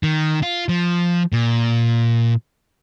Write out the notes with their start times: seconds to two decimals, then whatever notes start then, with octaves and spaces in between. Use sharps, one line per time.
0.03 D#3
0.43 F4
0.69 F3
1.32 A#2